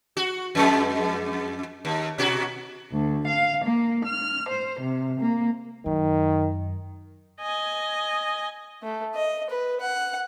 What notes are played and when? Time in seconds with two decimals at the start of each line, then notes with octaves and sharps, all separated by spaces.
0.17 F#4
0.55 F2 G#3
1.85 D#2
2.18 B2 F#4
2.91 D2
3.26 F5
3.64 A#3
4.05 F6
4.49 C5
4.80 C3
5.20 A#3
5.86 F#2 D#3
7.41 D#5 G#5
8.83 A3
9.15 D#5
9.50 B4
9.80 F#5